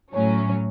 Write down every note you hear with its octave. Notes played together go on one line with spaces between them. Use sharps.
A2 F#3 C#4